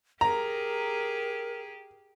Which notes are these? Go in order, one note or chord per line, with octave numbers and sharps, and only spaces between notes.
G4 G#4 A#4 A#5